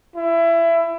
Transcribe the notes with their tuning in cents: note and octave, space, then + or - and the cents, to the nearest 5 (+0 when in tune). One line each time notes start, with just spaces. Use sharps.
E4 +20